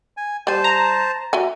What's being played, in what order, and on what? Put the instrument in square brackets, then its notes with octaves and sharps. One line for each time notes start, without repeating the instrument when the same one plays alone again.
[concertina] G#5
[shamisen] G3 G#5 [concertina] C5 A5
[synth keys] A#5
[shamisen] F#4 E5 G#5